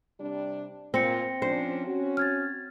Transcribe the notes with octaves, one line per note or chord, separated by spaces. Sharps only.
C3 G3 D4
A#2 C4 A#6 C#7
F3 C#4 D4 C5
C#4 F#4
F6 G#6 A6